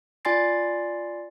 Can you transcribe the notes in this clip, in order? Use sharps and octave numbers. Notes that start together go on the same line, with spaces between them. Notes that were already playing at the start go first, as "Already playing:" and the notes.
F4 D5 G#5 C6 A6 C7